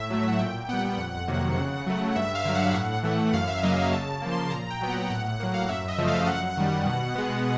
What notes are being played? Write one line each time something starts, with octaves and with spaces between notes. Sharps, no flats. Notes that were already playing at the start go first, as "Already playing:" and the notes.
Already playing: A2 E5
F#3 A3
F#5
A#2 G5
G3 B3 F#5
F2
C3 D#3 F#3 A#3
C#3
F#3 A3
G2 E5
F5
D3 F#3
F#5
A2
E3 A3
F#2 F5
E5
C#3 F#3 A#3 D#5
E5
C#3 A5
F3 A#3
C6
A#2 A#5
G5
F#3 B3
F#5
A2 F#5
F#3 A#3 F#5
F5
F#2 E5
D#5
C#3 F3 A3
F5
F#2 F#5
D#3 G3
B2
G#3 B3